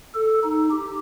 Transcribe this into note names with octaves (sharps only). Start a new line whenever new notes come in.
A4
D#4
G4